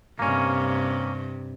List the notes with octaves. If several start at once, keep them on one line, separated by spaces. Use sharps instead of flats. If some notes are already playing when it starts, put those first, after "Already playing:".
G2 C3 A#3 C#4